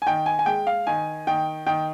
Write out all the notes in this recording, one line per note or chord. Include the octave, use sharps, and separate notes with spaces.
G#5
D#3 G5
G#5
G#5
G#3 G5
F5
D#3 G#5
D#3 G5
D#3 G5